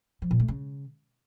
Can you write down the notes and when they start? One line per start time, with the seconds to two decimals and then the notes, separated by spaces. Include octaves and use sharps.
0.22 F3
0.31 A#2
0.40 A3
0.48 C#3